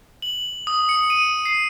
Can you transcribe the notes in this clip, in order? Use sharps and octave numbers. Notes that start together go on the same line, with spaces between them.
F#7
D#6
C#7
D#7
C7